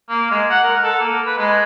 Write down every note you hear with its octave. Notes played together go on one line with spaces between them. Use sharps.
A#3
G#3
F#5
A#4
A4
A#3
B4
G#3